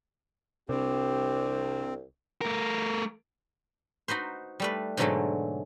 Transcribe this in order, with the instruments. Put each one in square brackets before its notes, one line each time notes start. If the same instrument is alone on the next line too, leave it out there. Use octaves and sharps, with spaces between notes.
[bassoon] C2 [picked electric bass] C3 D4 [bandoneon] C4 [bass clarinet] G4
[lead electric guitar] A3 A#4
[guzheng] D#4 F#4 B4 C5
G3 A3 B4
G#2 B2 D3 F#3 G#3 A3